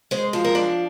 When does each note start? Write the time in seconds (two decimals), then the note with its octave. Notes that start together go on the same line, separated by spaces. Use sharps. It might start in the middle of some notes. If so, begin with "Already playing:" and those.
0.11 G#3 C5
0.33 F3
0.44 A#4
0.55 D4